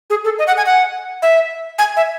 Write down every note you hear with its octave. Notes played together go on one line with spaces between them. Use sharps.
G#4
A4
D#5
F#5
G#5
F#5
E5
G#5
E5